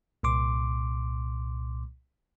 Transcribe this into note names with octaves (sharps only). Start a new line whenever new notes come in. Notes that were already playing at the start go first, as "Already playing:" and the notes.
C2 A#2 C6 D6